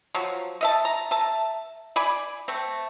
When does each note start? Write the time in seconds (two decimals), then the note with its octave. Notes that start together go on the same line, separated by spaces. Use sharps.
0.15 F3 F#3
0.61 D#5 E5 A5
0.85 A#5
1.11 E5 A5
1.96 D5 G#5 B5
2.48 A3 C4